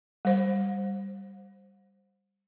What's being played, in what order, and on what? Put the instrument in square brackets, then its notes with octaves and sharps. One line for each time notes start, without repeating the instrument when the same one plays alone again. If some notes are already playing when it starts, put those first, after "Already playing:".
[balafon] G3 C5